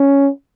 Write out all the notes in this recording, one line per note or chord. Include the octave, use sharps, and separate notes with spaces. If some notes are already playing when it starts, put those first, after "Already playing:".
Already playing: C#4